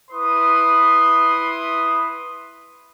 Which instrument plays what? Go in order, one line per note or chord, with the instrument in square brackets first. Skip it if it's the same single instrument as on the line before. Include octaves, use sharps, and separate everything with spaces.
[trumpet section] E4 B4 C6 D#6